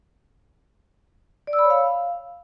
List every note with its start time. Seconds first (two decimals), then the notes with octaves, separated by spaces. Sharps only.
1.47 D5
1.53 E6
1.59 B5
1.65 C#5
1.70 F5